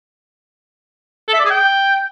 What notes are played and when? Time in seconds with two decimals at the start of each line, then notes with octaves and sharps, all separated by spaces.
1.28 A4
1.34 E5
1.39 D5
1.45 G#4
1.50 G5